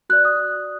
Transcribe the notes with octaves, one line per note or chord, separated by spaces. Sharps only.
F#4 D5 F#6
D#6